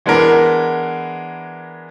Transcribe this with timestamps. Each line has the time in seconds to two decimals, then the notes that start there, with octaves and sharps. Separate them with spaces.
0.06 E3 G#3 B3 D4 A#4